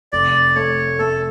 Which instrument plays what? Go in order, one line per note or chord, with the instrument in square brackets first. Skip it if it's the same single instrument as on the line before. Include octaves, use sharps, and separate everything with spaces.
[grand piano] F1 [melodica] D5
[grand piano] A3 [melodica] C#5
[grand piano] A3 [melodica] A4